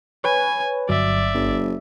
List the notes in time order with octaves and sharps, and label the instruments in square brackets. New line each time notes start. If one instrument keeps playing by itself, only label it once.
[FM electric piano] B4 C#5 [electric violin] G#5
[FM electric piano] G1 F#3 [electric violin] D5 E5
[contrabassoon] F#1